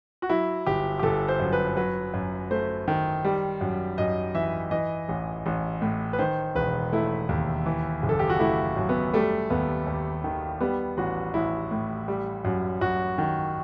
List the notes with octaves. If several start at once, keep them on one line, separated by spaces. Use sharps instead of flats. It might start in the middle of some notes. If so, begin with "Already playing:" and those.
F#4
F#3 E4
G1 G4
G4
G1 A4
C5
F#2
B4
F#3 B4
F#2
A3 C5
D#3
G3
F#2
F#2 D#5
E3 E5
E3 D#5
A1
A1
A2
B4
D#3 C5
E1 B4
A3 E4
D#2
E3
F#1
A4
G4
F#4
A3 E4
F#2
B3
G3 A3
D#2 B3
D#2
D#3
G3 B3
A1 F#4
A1 E4
A2
G3
F#2
F#2 F#4
D#3